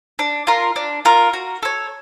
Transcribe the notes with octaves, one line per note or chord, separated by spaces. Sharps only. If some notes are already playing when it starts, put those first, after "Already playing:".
D4
F4 A#4
D4
F4 A#4
F#4
A4 C#5